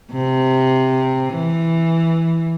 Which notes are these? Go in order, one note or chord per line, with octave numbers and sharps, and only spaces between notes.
C3
E3